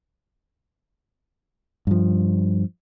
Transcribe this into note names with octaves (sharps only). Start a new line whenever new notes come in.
G2 F3